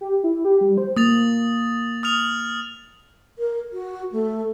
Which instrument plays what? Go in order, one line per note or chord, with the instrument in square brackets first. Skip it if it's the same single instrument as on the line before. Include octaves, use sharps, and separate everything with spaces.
[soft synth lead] G4
E4
G4
G3
C5
[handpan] A#3 [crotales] D#6 A6 F7
[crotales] D#6 F6 F7
[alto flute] A#4
F#4
A3